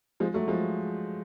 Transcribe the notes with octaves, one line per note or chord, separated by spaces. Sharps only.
F3 G#3
F#3 A3
F3 G#3